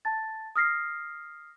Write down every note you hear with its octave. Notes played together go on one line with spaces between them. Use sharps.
A5 A6
D#6 F6 A#6 C7